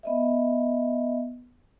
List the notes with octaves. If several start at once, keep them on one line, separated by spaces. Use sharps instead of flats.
B3 D#5 E5